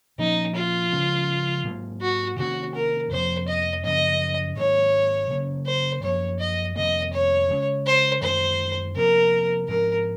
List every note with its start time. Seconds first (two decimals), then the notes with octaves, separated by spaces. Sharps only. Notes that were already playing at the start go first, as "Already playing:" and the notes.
0.18 A#2 F3 A#3 C#4 D#4
0.55 F4
0.92 C#3 F3 G#3 C#4
1.65 G#2 F#3 A#3
2.02 F#4
2.38 C3 D#3 A#3 C#4 F#4
2.75 A#4
3.11 F2 C3 F3 A#3 C5
3.48 D#5
3.84 F#2 C#3 F3 A#3 D#5
4.57 G#2 D#3 F#3 A#3 C#5
5.30 C#3 F#3 A#3 C#4
5.67 C5
6.03 F#2 F3 A#3 C#5
6.40 D#5
6.76 F2 C3 D#3 A#3 D#5
7.13 C#5
7.50 C#3 G#3 C#4
7.87 C5
8.22 F#2 D#3 G#3 C5
8.96 C3 F3 A#3 A#4
9.68 G#2 F3 C4 A#4